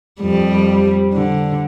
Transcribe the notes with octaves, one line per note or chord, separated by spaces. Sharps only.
F2 G3
D3